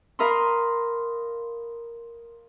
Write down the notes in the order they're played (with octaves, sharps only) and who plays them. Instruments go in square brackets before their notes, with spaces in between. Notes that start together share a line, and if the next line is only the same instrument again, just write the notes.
[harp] A#4 D#5 F5 B5 C6